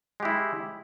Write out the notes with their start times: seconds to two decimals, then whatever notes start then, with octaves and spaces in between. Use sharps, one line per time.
0.20 G#3
0.23 G4
0.25 E4